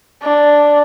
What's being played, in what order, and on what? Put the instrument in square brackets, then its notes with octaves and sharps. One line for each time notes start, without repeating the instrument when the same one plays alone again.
[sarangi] D4